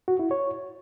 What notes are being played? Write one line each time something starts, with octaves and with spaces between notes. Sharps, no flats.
F#4
E4
C#5